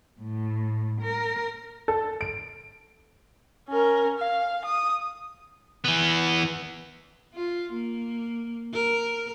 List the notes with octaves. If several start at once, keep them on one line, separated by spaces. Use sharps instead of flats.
A2
A#4
A4
D7
C#4 A#4
F5
D#6
E3 B3
F4
A#3
A#4